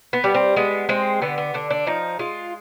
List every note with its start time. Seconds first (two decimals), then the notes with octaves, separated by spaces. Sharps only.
0.13 B3
0.24 G3
0.34 C4
0.56 G#3 B3
0.89 G#3 C4
1.21 D3 B3
1.38 B3
1.54 D3 D4
1.70 D4
1.87 F3 D#4
2.19 G#3 F4